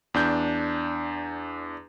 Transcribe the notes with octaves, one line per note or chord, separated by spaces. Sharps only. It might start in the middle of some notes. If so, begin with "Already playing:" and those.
E2 D4 G6